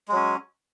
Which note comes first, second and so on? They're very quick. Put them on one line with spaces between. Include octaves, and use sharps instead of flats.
G#3 F#3 C#4